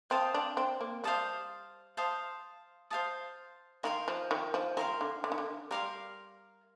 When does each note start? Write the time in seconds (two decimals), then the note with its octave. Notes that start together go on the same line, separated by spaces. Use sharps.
0.10 C4 C5 F5 A5 D#6
0.34 D4
0.57 C4
0.81 A#3
1.04 G3 C5 F5 A5 D#6
1.97 C5 F5 A5 D#6
2.90 C5 F5 A5 D#6
3.83 D#3 A#4 F5 C6
4.08 F3
4.31 D#3
4.54 F3
4.77 D#3 A#4 F5 C6
5.01 D3
5.24 D3
5.32 D#3
5.38 D3
5.71 G3 A#4 F5 C6